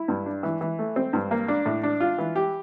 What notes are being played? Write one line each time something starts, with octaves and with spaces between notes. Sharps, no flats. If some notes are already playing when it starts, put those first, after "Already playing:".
Already playing: E4
G2
D4
E3
E3
A3
C4
G2
A#3
D4
A2
D4
F4
E3
G4